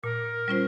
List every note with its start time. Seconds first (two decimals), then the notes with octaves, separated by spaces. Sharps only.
0.03 A#2 A#4
0.48 G3 C#4 F4 C5